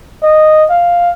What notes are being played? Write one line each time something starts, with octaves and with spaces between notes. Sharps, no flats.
D#5
F5